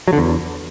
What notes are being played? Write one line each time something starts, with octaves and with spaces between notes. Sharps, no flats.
F#3
D3
E2